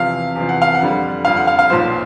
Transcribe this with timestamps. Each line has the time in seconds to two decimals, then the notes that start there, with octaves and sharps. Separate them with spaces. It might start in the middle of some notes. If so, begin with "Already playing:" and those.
Already playing: E2 C3 F3 F5
0.36 E2 C3 F3
0.49 F#5
0.62 F5
0.75 F#5
0.81 F2 D3 G3
1.25 F2 D3 G3 F5
1.37 F#5
1.47 F5
1.59 F5
1.70 B1 A#2 F3 C5